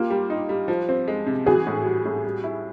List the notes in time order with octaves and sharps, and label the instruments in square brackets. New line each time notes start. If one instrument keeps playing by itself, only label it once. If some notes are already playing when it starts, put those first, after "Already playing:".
Already playing: [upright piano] A#3 [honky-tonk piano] F4 G4
[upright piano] G3
D#4
G3
F3
C4
G#3
C3
[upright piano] E3 [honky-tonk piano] F#4 G#4
[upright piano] A2
G3
A2
G3
E4